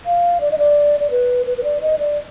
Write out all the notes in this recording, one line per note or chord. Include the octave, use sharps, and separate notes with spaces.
F5
D5
D#5
D5
D5
B4
B4
B4
D5
D#5
D5